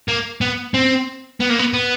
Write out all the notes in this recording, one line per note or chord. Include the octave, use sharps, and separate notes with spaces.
A#3
B3
C4
B3
A#3
B3
B3